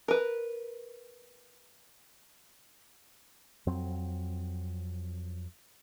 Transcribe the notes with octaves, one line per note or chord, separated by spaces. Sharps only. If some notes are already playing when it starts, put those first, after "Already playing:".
A#4 B4
F2 F#3 C4